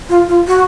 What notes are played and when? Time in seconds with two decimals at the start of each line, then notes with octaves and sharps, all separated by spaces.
0.09 F4
0.28 F4
0.47 F#4